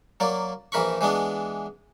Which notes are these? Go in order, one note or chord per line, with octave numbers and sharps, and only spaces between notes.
F#3 A#3 D5
A#1 E3 A#4 B5 C#6
E3 G#3 B3 D4